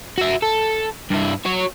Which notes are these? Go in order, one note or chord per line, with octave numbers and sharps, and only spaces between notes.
F#4 E5
A4
G2 E4
F#4 C#5